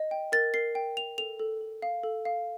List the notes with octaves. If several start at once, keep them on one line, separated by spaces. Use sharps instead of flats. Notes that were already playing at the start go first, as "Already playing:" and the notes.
Already playing: D#5
G5
A#4 A6
A#4 C7
G5
G5 F7
A4 F7
A4
A4
F5
A4
F5